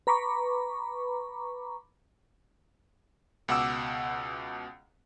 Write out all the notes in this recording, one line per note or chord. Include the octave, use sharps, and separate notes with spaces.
B4 A#5 B5 C#6 D6
C#2 B2 F#5 D6 E6